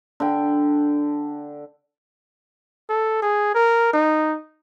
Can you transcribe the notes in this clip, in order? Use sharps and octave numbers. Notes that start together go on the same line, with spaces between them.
D3 G5
A4
G#4
A#4
D#4